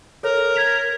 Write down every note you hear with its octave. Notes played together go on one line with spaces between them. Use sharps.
A4 A#4 C#5
G#6 B6 F7